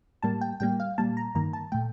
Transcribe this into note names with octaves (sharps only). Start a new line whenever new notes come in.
A2 G3 A#3 A5
G5
A2 G3 A#3 G5
F5
A#2 G3 A#3 A5
A#5
G2 D#3 A#3 A#5
A5
A#2 A3 G5